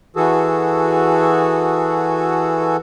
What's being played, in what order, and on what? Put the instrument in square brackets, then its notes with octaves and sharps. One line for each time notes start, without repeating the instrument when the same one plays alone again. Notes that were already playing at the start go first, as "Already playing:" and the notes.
[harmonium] E3 F#4 G#4 A4